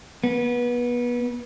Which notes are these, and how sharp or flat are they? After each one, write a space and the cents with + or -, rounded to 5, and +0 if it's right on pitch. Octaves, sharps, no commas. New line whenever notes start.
B3 -25